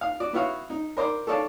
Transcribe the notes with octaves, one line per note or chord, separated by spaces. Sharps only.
F5
F#4 D5
B3 E4 F#4 C#5 F5
D#4
A#4 C5 D5 D6
A4 C#5 D5 F5 A5